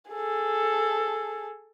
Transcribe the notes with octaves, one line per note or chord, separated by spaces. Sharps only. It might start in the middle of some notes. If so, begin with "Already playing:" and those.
G#4 A4